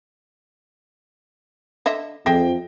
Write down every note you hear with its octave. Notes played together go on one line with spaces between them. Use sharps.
D3 D#5 E5
F2 G#4 E5 G5 A#6